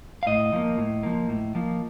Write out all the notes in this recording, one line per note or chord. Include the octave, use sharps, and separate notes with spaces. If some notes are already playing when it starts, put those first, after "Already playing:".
F5
A2 D#5
F3 A#3
A2
F3 A#3
A2
F3 A#3